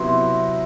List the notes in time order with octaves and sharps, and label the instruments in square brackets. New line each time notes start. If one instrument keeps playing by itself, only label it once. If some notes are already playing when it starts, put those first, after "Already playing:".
Already playing: [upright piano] C3 F#3 B3 E4 C6